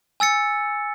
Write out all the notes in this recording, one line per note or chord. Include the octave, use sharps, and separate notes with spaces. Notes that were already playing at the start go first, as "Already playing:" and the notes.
G#5 E6 A6 C#7